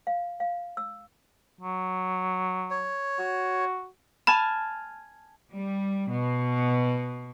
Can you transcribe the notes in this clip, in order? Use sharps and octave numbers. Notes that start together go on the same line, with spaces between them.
F5
F5
E6
F#3
C#5
F#4
G#5 A5 B5 F6
G3
B2